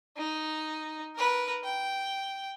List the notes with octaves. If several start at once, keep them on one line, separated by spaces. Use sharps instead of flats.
D#4
A#4 B4
G5